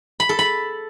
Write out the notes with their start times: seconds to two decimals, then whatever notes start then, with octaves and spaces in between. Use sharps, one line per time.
0.20 B5
0.29 A4
0.39 B5